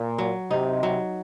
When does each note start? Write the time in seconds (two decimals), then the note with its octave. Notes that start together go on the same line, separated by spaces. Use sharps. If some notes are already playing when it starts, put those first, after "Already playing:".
Already playing: A#2
0.19 F#3
0.51 C3 D#4
0.83 F#3